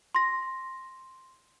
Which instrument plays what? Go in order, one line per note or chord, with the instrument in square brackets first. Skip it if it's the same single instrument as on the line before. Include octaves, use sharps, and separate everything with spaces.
[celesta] C6 A#6